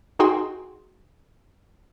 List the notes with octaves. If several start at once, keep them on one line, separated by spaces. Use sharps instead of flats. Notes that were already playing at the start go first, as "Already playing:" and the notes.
D#4 F#4 G#4 G5 C6